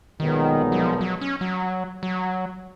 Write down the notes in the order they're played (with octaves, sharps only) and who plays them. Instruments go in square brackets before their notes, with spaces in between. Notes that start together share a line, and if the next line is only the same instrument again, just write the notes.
[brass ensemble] B1 A#2 G#3 B3 D#4 [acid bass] D#3
[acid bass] F#3
F3
F#3
C#4
F#3
F#3